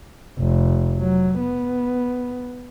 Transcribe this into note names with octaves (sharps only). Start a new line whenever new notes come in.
F1
F#3
B3